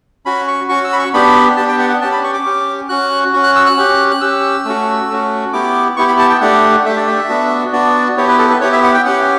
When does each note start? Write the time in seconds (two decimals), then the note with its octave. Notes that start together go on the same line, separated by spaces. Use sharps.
0.26 C#4 F#4 B5
0.48 C#6
0.69 C#4 F#4 C#6
0.84 E6
0.93 B5
0.99 C#6
1.14 B3 D4 G4 B5
1.57 B3 D4 G4 A5
1.68 G5
1.79 F#5
1.90 F#5
2.01 C#4 G4 A5
2.12 B5
2.24 C#6
2.34 D6
2.46 C#4 G4
2.89 C#4 F#4 F#6
3.33 C#4 F#4
3.44 F#6
3.56 E6
3.66 F#6
3.77 C#4 G4
4.11 F#6
4.21 C#4 G4 E6
4.65 A3 C#4 F#4
5.10 A3 C#4 F#4
5.53 B3 E4 G4 D6
5.97 B3 E4 G4 C#6
6.08 B5
6.19 A5
6.30 G5
6.41 A3 D4 G4 F#5
6.85 A3 D4 G4 E5
6.97 D5
7.08 E5
7.29 B3 D4 F#4
7.73 B3 D4 F#4 D5
8.17 B3 E4 G4 C#5
8.29 B4
8.39 A4
8.50 B4
8.61 B3 E4 G4 C#5
8.73 E5
8.83 F#5
8.94 G5
9.05 C#4 G4 F#5